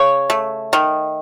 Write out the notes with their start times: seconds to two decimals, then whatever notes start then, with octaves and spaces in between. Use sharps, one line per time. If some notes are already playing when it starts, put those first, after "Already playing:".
Already playing: C#3 C#5
0.30 A3
0.73 D#3